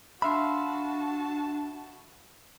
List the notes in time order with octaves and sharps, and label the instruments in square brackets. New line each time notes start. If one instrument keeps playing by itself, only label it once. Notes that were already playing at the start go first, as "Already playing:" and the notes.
[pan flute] D4 [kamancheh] F#4 A5 [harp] E5 F5 C6 [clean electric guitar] B5